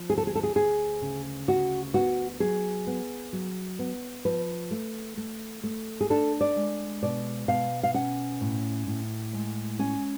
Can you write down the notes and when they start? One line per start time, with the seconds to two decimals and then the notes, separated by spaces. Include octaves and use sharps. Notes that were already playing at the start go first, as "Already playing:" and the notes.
Already playing: F3
0.09 D2 G#4
0.18 A4
0.27 G#4
0.35 A4
0.43 G#4
0.55 D2 G#4
1.02 C#3
1.48 D2 F#4
1.94 B3 F#4
2.40 F#3 G#4
2.87 B3
3.33 F#3
3.79 B3
4.25 F3 B4
4.71 A3
5.17 A3
5.64 A3
6.01 G#4
6.10 D4 A4
6.41 D5
6.56 G#3
7.03 B2 D5
7.48 B2 F5
7.83 F5
7.94 C#4 F#5
8.41 A2
8.87 A2
9.33 G#3
9.79 C#4 G#5